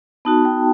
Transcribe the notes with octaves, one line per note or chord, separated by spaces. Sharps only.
B3 D#4 F#4 A5
G5